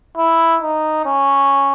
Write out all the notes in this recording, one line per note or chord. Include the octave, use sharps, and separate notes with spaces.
E4
D#4
C#4